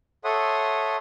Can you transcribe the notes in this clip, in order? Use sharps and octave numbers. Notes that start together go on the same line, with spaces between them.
A4 C#5 E5 F#5 C6 D#6